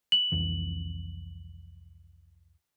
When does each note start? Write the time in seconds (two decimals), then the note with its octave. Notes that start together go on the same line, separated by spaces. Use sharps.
0.12 F#7
0.32 C2 F2 E3